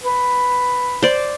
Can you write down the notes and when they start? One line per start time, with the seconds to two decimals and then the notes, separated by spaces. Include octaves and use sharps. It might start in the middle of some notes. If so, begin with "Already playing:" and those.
0.04 B4
1.03 C5 D5